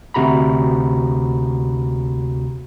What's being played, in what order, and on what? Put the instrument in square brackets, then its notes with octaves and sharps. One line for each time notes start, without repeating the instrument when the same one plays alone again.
[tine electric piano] D2 C3 F#4 A#5 B5